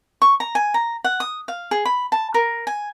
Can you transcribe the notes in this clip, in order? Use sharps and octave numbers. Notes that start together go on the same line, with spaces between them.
C#6
A#5
G#5
A#5
F#5
D#6
F5
G#4
B5
A5
A#4
G#5